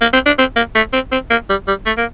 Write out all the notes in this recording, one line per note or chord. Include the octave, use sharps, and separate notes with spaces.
A#3
C4
D4
C4
A#3
A3
C4
C4
A#3
G3
G3
A3
A#3